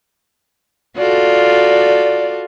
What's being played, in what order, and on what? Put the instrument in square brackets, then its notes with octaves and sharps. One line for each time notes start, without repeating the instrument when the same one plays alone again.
[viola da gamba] F4 F#4 A4 [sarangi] D5